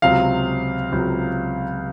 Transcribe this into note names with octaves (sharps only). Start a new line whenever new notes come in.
C#2 C3 F#3 F5
C#2 C3 F#3